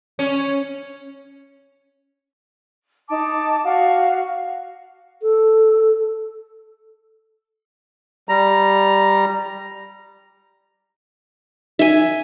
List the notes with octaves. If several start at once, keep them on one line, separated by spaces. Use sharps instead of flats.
C#4
D#4 A5 D6
F#4 F5
A4
G3 A#5
D#4 E5 G#5